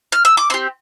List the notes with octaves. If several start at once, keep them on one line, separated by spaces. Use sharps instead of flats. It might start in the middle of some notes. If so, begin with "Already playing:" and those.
F6
E6
D6
C4 G4 C6